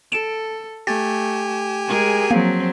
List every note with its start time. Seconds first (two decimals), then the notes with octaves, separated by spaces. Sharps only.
0.12 A4 D7 E7
0.87 A3 G4 G#5 A6
1.87 G#3 G#4 A#4
2.31 F3 F#3 A#3 C4